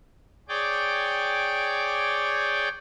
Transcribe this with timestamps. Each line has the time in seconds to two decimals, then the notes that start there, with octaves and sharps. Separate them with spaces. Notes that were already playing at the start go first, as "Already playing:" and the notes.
0.49 G#4 C#5 D5 G5 D6